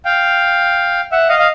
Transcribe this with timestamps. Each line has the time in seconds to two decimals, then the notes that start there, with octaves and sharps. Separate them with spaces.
0.05 F5 G5
1.12 E5 F#5
1.29 D#5 F5
1.39 F5